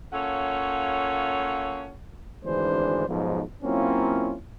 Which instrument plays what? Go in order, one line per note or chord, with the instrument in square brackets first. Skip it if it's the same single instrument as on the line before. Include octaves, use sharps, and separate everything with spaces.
[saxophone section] A#3 C#4 F4 A4 C#5 F#5
[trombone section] G#1 D2 E3 G#3 D4 C5
B1 G#2 B2 F3
F#3 A#3 C4 C#4 E4 F4